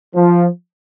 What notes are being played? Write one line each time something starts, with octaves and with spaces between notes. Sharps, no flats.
F3